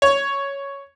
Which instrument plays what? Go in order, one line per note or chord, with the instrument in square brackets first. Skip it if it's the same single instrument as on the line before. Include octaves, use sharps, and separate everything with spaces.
[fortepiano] C#5